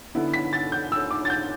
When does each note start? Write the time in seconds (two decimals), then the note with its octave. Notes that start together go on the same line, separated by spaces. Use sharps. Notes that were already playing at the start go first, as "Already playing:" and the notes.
0.15 D3 B3 E4
0.34 B6
0.53 A6
0.72 G6
0.92 E6
1.11 D6
1.25 A6
1.30 G6